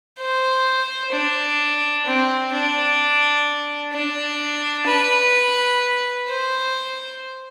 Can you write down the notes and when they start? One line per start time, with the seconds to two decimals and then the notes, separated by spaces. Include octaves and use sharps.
0.20 C5
1.13 D4
2.07 C4
2.53 D4
3.93 D4
4.87 B4
6.28 C5